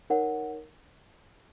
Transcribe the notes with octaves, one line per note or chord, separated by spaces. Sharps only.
D#4 A#4 C#5 F#5